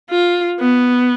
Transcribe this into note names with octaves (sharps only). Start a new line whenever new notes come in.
F4
B3